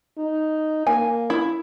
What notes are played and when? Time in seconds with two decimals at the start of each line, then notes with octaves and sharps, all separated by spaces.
0.18 D#4
0.87 A#3 G#5
1.30 E4